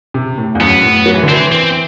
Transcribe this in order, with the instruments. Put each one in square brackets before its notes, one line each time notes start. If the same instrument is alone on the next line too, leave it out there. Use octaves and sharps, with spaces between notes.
[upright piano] C3
A2
E2
[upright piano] F#2 [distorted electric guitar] B3
[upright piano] A2
F#3
E3
D3
[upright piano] E3 [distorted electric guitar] C4
[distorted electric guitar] C4